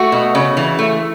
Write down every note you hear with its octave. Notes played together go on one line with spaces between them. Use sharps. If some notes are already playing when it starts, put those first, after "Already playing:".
Already playing: A3 F#4
B2
C#3
E3
A3